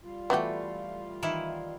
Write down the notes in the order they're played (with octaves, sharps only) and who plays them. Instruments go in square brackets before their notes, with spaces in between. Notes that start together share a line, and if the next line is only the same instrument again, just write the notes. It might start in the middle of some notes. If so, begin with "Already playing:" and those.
[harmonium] G3 F4
[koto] E3 A3 [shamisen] B3 F#4 G4
[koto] D#3 E3 E4